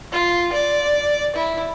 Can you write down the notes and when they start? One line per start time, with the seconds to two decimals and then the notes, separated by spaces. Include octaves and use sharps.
0.12 F4
0.53 D5
1.36 E4